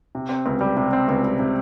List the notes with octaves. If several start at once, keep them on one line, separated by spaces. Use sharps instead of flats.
C3
C4
C#2
G3
C3
C4
C#2
G3
C3